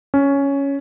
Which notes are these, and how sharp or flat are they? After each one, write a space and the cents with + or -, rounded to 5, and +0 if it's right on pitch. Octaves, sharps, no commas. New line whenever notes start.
C#4 +5